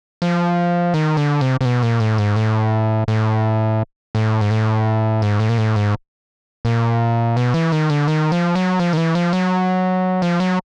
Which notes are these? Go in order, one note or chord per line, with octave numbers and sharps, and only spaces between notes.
F3
D#3
D3
C3
C3
B2
A#2
A2
G#2
A2
A2
A2
G#2
A2
G#2
A2
A#2
A2
G#2
A#2
B2
E3
D#3
D3
D#3
F3
F#3
F3
D#3
E3
F3
F#3
F3
F#3